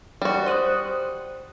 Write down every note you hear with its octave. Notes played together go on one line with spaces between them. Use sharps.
G3 F#4
C5 D#6 F#6